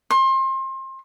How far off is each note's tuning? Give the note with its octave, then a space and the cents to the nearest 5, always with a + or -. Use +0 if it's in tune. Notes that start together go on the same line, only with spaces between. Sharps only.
C6 +30